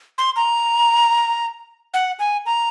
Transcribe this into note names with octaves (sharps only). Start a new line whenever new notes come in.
C6
A#5
F#5
G#5
A#5